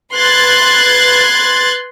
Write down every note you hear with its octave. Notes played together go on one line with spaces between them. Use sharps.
B4 C6 F#6 G#6 A6